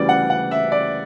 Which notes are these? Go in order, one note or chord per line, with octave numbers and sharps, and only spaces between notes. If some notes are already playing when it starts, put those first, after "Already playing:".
Already playing: D2 C#3 E3 G3 D5
F#5
F#5
E5
D5